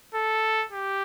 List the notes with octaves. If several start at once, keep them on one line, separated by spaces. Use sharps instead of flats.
A4
G4